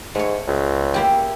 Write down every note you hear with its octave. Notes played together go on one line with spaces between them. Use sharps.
G#2 A3 C#5
C#2
A#3 E4 G4